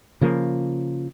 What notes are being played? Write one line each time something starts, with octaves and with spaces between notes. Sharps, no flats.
C#3 F3 A#3